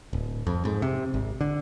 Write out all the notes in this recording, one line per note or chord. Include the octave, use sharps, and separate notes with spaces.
D1
F2
G#2
C3
G#1
D3